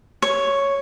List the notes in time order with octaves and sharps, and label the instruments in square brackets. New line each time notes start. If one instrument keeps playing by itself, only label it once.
[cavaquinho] C#5